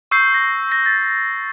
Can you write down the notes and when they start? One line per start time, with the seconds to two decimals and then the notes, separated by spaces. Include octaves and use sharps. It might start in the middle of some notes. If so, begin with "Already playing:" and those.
0.11 C#6 E6 G6 C7
0.34 A#6
0.72 A#6
0.86 A6